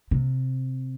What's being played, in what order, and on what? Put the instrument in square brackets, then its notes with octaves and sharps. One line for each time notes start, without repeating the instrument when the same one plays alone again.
[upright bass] C3